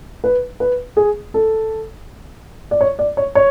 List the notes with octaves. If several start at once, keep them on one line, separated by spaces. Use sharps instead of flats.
B4
B4
G#4
A4
D5
C#5
D5
C#5
C#5